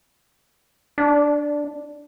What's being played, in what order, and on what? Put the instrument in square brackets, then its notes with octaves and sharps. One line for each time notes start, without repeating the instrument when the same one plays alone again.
[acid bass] D4